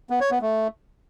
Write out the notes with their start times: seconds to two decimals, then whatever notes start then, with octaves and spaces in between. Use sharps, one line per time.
0.10 B3
0.21 C#5
0.31 B3
0.42 A3